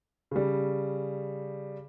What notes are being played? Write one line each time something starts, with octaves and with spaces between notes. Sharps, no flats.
C#3 G3